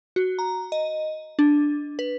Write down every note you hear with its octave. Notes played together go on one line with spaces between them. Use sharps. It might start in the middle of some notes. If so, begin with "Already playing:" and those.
F#4
A#5
D#5
D4
B4